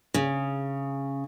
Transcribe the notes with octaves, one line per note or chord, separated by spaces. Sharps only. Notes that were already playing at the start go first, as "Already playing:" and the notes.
C#3